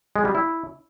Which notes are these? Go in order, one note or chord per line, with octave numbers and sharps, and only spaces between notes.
G#3
G3
E4